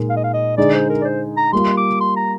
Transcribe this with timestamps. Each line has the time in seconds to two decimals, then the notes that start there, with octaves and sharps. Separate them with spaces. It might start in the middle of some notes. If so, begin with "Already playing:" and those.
Already playing: A#2 G#3 D#4 A#4
0.10 F5
0.17 D#5
0.24 F5
0.34 D#5
0.57 D3 G#3 D#4 G#4 D5
0.74 C5
0.90 A#4
1.01 D5
1.05 C5
1.37 A#5
1.52 G3 A#3 F4 C6
1.77 D6
2.00 C6
2.16 A#5